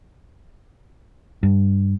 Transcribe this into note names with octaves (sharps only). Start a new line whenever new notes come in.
G2